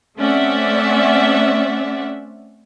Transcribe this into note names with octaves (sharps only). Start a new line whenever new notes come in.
A3 C4 C#4 D5 E5 F#5